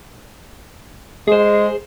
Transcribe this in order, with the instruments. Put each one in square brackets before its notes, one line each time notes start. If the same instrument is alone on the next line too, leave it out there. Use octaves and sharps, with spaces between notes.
[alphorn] G#3 [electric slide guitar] G#4 C5